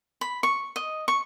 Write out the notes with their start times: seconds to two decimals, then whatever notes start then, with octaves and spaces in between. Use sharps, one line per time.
0.21 B5
0.43 C#6
0.76 D#5
1.08 C#6